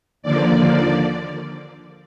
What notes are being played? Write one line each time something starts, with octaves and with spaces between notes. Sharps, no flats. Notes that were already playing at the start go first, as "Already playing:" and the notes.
D#2 D3 F3 A#3 D5
D#2 D3 F3 A#3